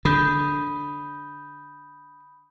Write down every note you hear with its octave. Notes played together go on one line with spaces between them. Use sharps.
D3 B5 D#6 G6